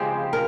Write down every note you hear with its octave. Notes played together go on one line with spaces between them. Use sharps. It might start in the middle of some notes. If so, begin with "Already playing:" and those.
Already playing: C#3 F3 G#3 C4 G4
A#4